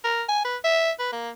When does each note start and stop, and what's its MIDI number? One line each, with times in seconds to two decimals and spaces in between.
0.04 0.23 70
0.29 0.43 80
0.45 0.57 71
0.64 0.91 76
0.99 1.12 71
1.13 1.30 58